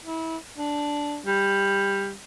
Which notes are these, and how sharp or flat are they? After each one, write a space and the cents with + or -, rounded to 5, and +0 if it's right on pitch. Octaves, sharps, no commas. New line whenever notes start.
E4 -25
D4 -5
G3 +15